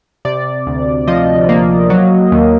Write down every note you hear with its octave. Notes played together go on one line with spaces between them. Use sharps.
C3 D5
D2
F3 D#5
A#3
F#3
D#2